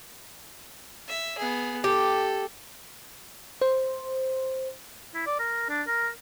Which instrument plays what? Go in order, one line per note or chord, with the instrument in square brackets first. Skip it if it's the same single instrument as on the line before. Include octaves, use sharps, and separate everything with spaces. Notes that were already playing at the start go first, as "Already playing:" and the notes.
[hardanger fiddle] E5
B3 G#4
[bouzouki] G4 [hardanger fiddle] A4
[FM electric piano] C5
[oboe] E4
D5
A#4
D4
A#4